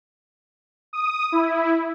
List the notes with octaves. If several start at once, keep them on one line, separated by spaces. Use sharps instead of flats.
D#6
E4